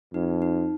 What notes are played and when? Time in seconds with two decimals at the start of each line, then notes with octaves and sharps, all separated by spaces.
0.13 F2 D#4
0.42 D#4